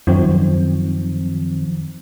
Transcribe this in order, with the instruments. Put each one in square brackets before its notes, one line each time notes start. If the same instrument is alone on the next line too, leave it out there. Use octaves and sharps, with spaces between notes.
[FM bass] F#2 [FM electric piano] D#3 F3 C4